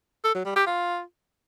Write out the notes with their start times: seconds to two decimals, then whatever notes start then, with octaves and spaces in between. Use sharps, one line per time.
0.24 A4
0.35 F#3
0.45 G3
0.56 G4
0.67 F4